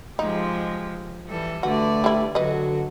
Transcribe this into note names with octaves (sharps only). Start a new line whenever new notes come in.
F3 G#3 D#4 G4
E3 G3 A4
D3 A3 F#4 B4 D5
G3 E4
D3 F#3 F#4 B4 D#5